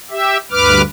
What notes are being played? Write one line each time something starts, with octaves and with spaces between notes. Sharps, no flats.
G4 E5
D2 G2 B4 D6 F6